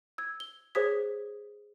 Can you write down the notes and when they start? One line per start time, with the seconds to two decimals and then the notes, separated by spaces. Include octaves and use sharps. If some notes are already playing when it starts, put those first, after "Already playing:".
0.18 E6 G#6
0.40 G7
0.75 G#4 C5 C#5 D#6 G#6 B6